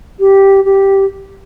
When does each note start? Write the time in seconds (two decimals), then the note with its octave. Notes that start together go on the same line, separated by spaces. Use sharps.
0.19 G4
0.65 G4